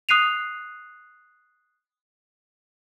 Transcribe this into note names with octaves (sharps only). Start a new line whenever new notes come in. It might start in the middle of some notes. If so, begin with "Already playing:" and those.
D#6 F#6 C7 D#7 F7